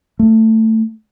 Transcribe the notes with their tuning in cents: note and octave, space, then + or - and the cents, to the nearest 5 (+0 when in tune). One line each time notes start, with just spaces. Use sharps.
A3 +15